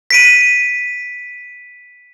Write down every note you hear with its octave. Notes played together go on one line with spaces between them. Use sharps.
B6 D7 D#7